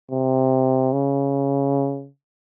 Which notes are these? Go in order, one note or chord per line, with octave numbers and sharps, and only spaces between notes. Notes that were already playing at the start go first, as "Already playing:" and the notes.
C3
C#3